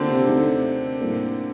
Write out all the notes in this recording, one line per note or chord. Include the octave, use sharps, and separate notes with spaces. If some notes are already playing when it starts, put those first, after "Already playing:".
Already playing: D3 D#3 A#3 C4 D4 F4
C3
D#2 D3 A3 C4 D#4
A2 G3 A#3 D4